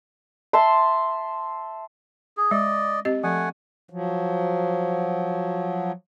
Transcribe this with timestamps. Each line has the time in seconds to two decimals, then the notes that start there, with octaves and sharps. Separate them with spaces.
0.53 E5 A5 C6
2.37 G#4
2.51 G#3 D5 D#5
3.05 C4 G4 D#5
3.24 F3 A3 F#5 G#5
3.90 F3 F#3